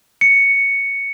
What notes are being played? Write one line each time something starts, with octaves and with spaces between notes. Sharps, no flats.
C#7